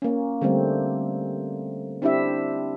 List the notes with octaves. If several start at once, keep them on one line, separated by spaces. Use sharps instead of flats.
A#3 C#4
D3 G3 A3 C4
C4 D4 E4 G4 E5